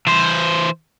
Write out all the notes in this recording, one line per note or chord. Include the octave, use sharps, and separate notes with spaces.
E3 C5